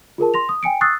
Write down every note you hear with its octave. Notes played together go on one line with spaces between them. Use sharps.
F4 G#4 A#4 A5
C6 A#6 F7
D#6
G5 G#5 C#7 D7
C#6 D#6 E6 F#6 A6 C7